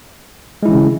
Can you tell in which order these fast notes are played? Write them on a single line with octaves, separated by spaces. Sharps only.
G#3 E4 E3 C#4 C#3